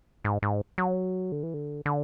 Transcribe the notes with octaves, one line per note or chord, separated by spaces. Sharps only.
G#2
G#2
F#3
D3
E3
D3
D3